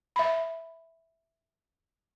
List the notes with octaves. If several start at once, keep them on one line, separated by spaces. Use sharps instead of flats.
E5 B5